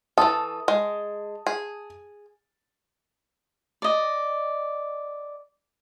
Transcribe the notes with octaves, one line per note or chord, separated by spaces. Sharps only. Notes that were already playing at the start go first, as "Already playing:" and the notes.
E3 A4 A5 D#6
G#3
G#4
D5 D#5